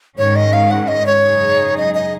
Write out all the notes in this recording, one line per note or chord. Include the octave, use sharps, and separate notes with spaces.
G#2 D#3 G#3 C#4 C#5
D#5
F5
F#5
D#5
C#5
F#2 C#3 G#3 D#4 G#4
D#5
D#5